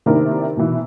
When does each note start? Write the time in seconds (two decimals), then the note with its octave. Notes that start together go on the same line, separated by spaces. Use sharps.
0.06 C3 D#3 A#3 D4 E4 A#4
0.57 B2 E3